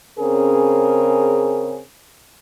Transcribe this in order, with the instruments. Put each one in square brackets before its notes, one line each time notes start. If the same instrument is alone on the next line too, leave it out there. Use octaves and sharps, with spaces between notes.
[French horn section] C#3 C4 C#4 G#4 A#4